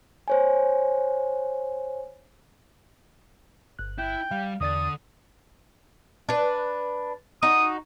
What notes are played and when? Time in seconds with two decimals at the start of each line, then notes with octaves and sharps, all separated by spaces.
0.28 C5 C#5 G#5
3.79 G1 F#6
3.98 E4 G5
4.31 G3 F5
4.61 E2 D3 D5 D#6 A6
6.29 D4 B4
7.43 D#4 F#4 D#6